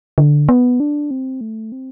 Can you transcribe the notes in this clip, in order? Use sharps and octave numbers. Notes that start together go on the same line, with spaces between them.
D3
B3
D4
C4
A3
C4